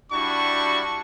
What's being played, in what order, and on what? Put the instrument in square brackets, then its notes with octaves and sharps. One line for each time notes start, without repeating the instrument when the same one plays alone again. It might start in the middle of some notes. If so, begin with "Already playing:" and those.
[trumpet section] G3 D4 E4 F#4 A5 C#6